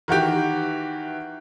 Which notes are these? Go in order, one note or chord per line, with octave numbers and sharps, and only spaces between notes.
D#3 E3 F#4 G4